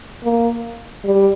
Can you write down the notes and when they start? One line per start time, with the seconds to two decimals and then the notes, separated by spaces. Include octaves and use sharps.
0.24 A#3
1.04 G3